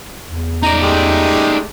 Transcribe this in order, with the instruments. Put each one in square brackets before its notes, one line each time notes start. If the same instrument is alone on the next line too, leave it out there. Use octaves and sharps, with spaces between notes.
[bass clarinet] E2
[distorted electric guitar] D#4 D5 [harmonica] A#5
[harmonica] G#3 A3 G4